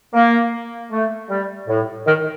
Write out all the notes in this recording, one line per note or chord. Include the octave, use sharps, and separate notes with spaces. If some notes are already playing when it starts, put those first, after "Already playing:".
A#3
A3
G3
A2
D#3